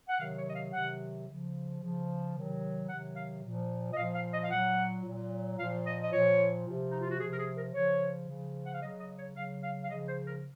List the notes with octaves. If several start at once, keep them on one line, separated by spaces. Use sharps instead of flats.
F#5
C3 D#3 F#3 F5
C#5
D#5
F5
C3 D#3 F#3 F#5
C#3 F3
C#3 F3
C3 D#3 F#3
C3 D#3 F#3 F#5
F5
A#2 F3
D#5
A#2 F3 F5
F5
D#5
F5
A#2 F#3 F#5
A#2 F#3
A#2 F3 F5
D#5
D#5
A#2 F3 C#5
C3 F3
D#4
F4
F#4
C3 F3 G#4
A#4
G#4
A#4
C#3 F3 C#5
C#3 F3
F#5
F5
C#3 F#3 D#5
D#5
C#5
C#3 F#3 F5
F5
F5
C#3 F3 D#5
C5
A#4